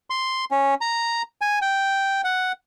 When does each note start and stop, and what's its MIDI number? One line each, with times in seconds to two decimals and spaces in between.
0.10 0.45 84
0.51 0.74 61
0.81 1.22 82
1.41 1.59 80
1.62 2.21 79
2.24 2.52 78